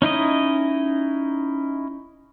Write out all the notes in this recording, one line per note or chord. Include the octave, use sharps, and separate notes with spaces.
C#4 D#4 E4 D#5